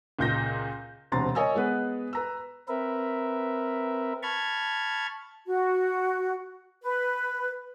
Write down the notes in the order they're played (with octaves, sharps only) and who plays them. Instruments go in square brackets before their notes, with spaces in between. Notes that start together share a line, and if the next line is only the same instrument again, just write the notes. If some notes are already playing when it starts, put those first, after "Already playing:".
[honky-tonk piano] C#2 A#2 G6 A#6
[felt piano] E1 D2 C3 A#5 C6 A6
A#4 C#5 D#5 G#5 D#6 E6
G#3 B3 B4
B4 A#5 E6
[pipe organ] C4 A#4 B4 E5
A5 B5 C#6 F6 G#6
[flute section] F#4
B4